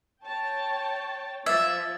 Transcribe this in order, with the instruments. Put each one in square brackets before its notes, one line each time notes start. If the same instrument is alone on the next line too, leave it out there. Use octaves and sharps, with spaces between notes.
[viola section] C#5 G5 A5
[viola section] F3 [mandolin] E5 [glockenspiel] G#6 A6